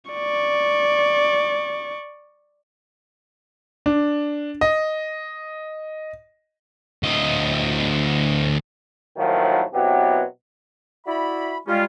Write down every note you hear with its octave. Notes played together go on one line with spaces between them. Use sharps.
D5 C#6
D4
D#5
D2 D#5
D#2 A2 D#3 F3 F#3
B2 F#3 B3 C4 E4 G4
E4 F#4 D5 E5 B5
G3 G#3 C#4 F4